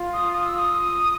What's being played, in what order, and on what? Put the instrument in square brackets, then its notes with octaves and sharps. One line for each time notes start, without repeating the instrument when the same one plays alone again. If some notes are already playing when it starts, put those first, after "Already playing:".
Already playing: [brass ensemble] F4
[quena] D#6
D#6
E6
D#6